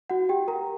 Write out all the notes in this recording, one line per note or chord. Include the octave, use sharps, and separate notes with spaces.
F#4 F#5
G4 G5
A#4 A#5